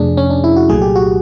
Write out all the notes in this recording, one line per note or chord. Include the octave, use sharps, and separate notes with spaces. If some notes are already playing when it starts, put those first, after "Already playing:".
Already playing: F2 C3 F3 A3 D4 G#4
C#4
D4
E4
F#4
C2 A#2 F#3 A3 G#4
G4
F#4